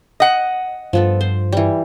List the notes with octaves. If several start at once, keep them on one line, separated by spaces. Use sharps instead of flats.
D#5 F#5
G2 F3 B3 A4
C5
E3 G3